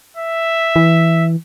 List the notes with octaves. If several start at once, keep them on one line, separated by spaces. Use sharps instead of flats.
E5
E3